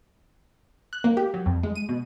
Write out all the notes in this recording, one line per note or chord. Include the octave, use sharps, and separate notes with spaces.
F#6
A#3
G4
F#3
F2
G#3
D#7
B2